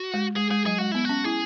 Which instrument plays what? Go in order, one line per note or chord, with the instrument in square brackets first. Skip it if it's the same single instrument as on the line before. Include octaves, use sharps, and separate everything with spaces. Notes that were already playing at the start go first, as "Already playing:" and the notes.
Already playing: [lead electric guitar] F#4
[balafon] G#3
[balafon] G#3 [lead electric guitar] G#4
[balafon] G#3 [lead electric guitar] G#4
[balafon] F#3 [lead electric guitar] G#4
[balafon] G#3 [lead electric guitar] F#4
[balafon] B3 [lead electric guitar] E4
[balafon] C#4 [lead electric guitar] F#4
[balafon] E4 [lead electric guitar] G#4